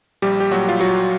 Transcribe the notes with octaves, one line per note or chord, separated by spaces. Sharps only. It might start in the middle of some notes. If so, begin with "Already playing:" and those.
A#1 G3 G4
G4
A#2 F#3 F#4
F4
A#2 F#3 F#4